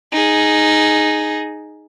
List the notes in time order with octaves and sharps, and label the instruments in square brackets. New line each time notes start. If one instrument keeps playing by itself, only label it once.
[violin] D#4 G#4